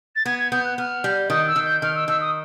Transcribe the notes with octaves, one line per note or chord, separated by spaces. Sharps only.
A6
B3 G#6
G#6
B3 G6
F#6
B3 F6
G3
D#3 D#6
E6
D#3
G6
D#3 F6
E6
D#3 E6
D#6